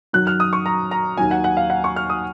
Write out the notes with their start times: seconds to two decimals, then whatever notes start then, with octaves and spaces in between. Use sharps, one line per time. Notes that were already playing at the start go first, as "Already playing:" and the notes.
0.13 F#2 D#3 F#3 F#6
0.27 F6
0.40 D#6
0.53 C#6
0.66 A#5
0.91 A#5
1.17 D#2 D#3 F#3 G#5
1.31 F#5
1.44 F#5
1.57 F5
1.70 F#5
1.84 C#6
1.96 F6
2.10 D#6